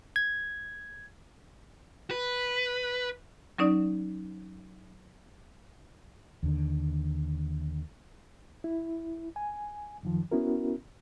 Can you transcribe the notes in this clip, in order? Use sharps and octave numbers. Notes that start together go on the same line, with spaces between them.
G#6
B4
F#3 C#4 D#4 D5
D#2 D3
E4
G#5
F#2 D#3 F3
B3 C#4 E4 F#4 A#4